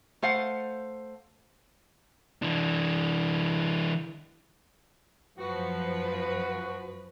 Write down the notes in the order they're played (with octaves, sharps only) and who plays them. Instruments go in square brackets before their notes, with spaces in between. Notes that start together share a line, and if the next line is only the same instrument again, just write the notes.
[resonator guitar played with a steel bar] A3 C5 F5 F#5
[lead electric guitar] E3 D4
[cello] F#2 B4 [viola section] F3 [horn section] F#4